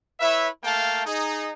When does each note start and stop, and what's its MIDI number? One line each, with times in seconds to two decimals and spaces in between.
0.20 0.48 64
0.20 0.48 71
0.20 0.48 73
0.20 0.48 76
0.64 1.05 57
0.64 1.05 58
0.64 1.05 77
0.64 1.05 79
0.64 1.05 81
1.05 1.51 63
1.05 1.51 68